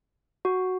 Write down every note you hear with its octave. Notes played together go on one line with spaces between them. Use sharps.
F#4